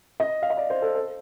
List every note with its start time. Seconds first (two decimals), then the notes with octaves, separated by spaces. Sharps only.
0.20 D#5
0.42 F5
0.50 D#5
0.57 D5
0.70 C5
0.82 A4
0.95 A4